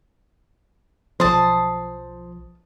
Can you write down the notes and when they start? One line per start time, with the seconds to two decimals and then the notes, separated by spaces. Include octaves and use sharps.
1.20 B1 F3 C5 A5 D#6